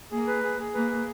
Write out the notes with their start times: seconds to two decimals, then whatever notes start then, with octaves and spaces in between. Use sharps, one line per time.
0.12 A#3 G#4
0.27 B4
0.43 G#4
0.60 G#4
0.74 A#3 B4
0.90 G#4